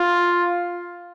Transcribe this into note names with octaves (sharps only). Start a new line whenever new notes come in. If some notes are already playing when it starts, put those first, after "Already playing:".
Already playing: F4